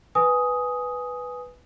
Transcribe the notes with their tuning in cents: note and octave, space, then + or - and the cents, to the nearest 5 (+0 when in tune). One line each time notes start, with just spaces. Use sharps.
B4 +0 G#5 +0 D#6 +10